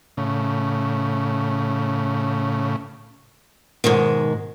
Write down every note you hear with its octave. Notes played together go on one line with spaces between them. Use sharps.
A2 C#3
G#2 B2 D#3 G#3